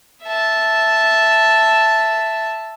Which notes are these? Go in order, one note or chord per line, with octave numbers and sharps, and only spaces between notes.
E5 A5